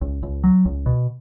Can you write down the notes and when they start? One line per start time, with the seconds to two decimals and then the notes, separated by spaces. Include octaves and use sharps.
0.01 C#2
0.23 C#2
0.44 F#3
0.65 C#2
0.86 B2